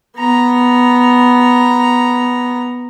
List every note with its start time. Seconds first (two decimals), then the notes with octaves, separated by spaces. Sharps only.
0.17 B3 A#5